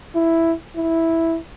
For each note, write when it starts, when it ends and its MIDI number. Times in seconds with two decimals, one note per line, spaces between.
0.15 0.53 64
0.76 1.38 64